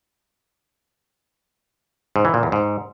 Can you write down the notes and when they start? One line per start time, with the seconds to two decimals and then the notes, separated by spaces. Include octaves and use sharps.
2.16 G#2
2.25 E3
2.34 A#2
2.43 E2
2.52 G#2